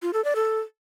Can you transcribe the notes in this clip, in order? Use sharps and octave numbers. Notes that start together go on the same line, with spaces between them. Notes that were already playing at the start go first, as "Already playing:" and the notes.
F4
A4
D5
A4